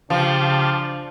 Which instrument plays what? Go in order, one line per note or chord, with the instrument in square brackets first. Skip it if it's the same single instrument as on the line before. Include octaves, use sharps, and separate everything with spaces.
[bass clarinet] C#3 [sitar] F3 [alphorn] D4 [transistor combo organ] G4 F5 A5